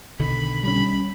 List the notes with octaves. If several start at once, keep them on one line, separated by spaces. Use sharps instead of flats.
B1 D3 D#3 B5
G3 C#4 B5